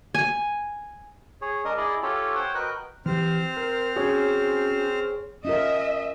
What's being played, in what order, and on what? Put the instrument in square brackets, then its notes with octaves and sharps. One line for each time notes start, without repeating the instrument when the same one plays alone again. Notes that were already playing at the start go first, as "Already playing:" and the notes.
[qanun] G#5
[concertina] G#4 C#5
G#3 D4 A#4 D#5 D#6
E4 G#4 D5 D#5
C#4 F4 G4 A4 C#5
C5 C#5 F#5 G5
F#4 A#4 B4 D#5 G5 F#6
[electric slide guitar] E3 G4 [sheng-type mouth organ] C4 C5 F6
[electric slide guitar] A#4
[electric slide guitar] C#4 F#4 [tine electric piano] G#4 C#5
[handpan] C#4 F4 A#4 [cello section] D#5 E5